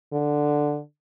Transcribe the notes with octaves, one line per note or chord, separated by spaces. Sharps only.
D3